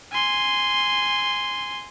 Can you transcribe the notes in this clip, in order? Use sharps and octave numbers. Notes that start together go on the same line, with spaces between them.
G#5 C6